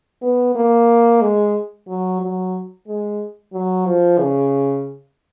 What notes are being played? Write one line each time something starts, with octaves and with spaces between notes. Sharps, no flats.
B3
A#3
G#3
F#3
F#3
G#3
F#3
F3
C#3